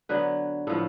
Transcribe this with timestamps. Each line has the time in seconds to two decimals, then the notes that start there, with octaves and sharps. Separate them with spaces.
0.09 D3 F#3 B3 B4
0.67 A2 F3 B3 A4